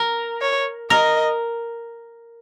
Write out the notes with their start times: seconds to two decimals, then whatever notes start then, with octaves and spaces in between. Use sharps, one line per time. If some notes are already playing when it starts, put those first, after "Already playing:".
Already playing: A#4
0.42 C#5
0.90 A#4 D#5